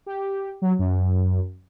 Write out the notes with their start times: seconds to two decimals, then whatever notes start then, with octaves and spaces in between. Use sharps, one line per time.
0.06 G4
0.62 F#3
0.79 F#2